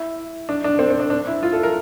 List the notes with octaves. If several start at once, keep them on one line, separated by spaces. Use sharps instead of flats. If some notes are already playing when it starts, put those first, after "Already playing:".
Already playing: E4
D4
D4
C4
C4
D4
D4
E4
F4
A4
A#4